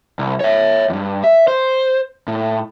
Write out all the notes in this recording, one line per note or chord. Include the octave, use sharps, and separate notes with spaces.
C2
C#5 E5
E2 G2
E5
C5
A2